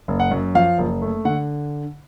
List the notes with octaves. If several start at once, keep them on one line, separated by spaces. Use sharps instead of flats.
F#1
F#5
F#2
F3 F5
F#1
A3
D3 F#5